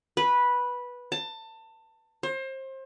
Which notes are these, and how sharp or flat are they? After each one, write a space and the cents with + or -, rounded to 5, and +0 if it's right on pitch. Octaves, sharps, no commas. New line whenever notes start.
B4 -10
A5 +25
C5 +30